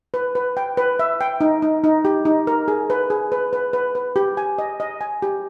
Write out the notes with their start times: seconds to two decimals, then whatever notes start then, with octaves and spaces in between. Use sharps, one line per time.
0.14 B4
0.35 B4
0.57 G5
0.77 B4
0.99 E5
1.21 G5
1.41 D#4
1.62 D#4
1.84 D#4
2.05 G4
2.25 D#4
2.47 A#4
2.68 G#4
2.90 B4
3.10 G#4
3.32 B4
3.53 B4
3.73 B4
3.95 B4
4.16 G4
4.37 G#5
4.58 D#5
4.80 D#5
5.01 G#5
5.22 G4